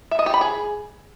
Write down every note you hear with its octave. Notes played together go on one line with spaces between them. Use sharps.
E5
D#5
G4
B5
G#4